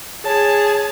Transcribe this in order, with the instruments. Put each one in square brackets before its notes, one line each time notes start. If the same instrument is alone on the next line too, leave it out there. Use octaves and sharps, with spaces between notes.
[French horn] G#4 [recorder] C#5 [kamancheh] A5